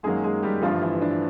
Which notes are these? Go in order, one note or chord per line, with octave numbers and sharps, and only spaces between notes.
F#2 D#3 F#3 G#3 A#3 G#4
G#3 G#4
G3 G4
A1 G2 D3 F3 F4
E3 E4
D4